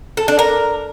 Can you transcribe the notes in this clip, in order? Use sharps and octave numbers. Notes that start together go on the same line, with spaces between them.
A4
D4
A#4